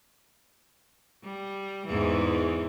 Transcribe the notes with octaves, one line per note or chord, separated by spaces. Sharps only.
G3
E2 G#2 E3